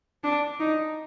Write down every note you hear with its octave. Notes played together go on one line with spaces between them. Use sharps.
D4
D#4